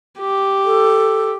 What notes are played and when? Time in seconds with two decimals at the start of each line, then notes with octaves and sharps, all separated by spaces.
0.19 G4
0.65 A4